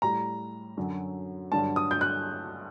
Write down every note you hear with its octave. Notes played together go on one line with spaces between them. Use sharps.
A2 G3 A#5
F#2 D3 F#3
G2 D3 F#3 A5
D#6
G6
F#6